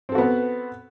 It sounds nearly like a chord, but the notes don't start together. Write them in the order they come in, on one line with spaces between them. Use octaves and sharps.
C4 A4 F#4 B3 B4